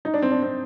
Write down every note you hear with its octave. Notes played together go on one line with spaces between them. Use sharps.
D#4
D4
C4
D4
C4